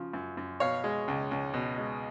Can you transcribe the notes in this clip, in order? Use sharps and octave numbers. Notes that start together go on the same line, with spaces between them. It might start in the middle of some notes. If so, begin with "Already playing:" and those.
Already playing: C#3 F3
F#2
F#2
B2 C#5 F5
G#3
C#2
C#2
B2
G#3